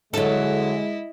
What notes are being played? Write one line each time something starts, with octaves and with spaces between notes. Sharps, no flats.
D3 F#3 G#3 E4 A4 D#5